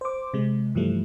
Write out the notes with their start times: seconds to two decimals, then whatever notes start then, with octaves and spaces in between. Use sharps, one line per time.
0.01 C5 D6
0.34 C3 G#3
0.75 G2 E3 F3 G3 A3